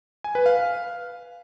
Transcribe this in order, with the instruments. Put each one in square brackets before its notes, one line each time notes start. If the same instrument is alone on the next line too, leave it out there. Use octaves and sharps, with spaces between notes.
[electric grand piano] G#5
B4
F5